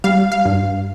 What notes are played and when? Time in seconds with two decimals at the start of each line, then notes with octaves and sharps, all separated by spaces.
0.04 G3 F5
0.32 F5
0.45 G2